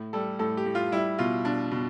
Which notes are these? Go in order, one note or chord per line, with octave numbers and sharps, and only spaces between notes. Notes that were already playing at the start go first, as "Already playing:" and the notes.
Already playing: A2
G3 A4
A2 A4
G4
A2
F4
G3 E4
B2 F4
B2 D4
B2